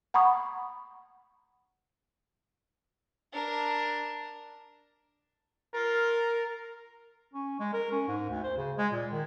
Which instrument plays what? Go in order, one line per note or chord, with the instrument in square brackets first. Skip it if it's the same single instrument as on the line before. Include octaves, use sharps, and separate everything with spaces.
[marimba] F#5 A#5 B5 C#6 D#6
[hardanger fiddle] D4 A#4
[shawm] F4 [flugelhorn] A#4
[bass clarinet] C#4
G#3
A#4
C#4
G#2
D2
C5
C#3
G#3
A#2
D#3